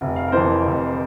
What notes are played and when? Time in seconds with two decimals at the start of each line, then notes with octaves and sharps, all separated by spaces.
0.01 F1
0.16 F5
0.28 A#4
0.32 F2 E3 C5
0.65 F1